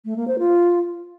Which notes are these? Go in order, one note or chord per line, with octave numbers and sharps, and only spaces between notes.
A3
A#3
C5
F4